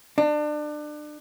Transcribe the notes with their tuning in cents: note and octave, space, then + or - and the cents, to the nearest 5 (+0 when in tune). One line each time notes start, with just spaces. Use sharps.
D4 +30